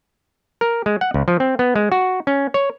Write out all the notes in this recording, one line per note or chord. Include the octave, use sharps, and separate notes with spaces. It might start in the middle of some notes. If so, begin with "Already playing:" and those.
A#4
G#3
F#5
C#2
F3
C4
B3
G#3
F#4
C#4
C#5